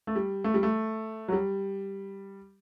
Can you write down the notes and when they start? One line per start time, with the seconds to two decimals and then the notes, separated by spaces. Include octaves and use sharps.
0.07 A3
0.16 G3
0.44 A3
0.54 G3
0.63 A3
1.28 F#3
1.32 G3